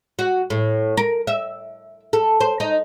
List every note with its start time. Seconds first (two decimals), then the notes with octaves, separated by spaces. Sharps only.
0.19 F#4
0.50 A2
0.97 A#4
1.27 E5
2.13 A4
2.40 C5
2.60 D#4